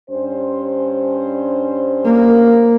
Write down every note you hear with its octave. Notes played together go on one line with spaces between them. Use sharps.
G2 C#4 C5
A#3